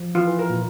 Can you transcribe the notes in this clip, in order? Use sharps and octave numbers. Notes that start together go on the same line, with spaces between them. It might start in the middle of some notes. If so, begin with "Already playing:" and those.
Already playing: F3
E3 F4
E3
A#4
A#2